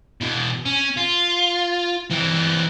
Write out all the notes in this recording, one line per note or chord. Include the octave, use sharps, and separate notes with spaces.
B2 E3
C#4
F4
E3 C4